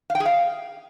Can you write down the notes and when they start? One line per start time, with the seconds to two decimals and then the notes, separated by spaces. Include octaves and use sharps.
0.10 F5
0.15 G5
0.20 G#4
0.25 F5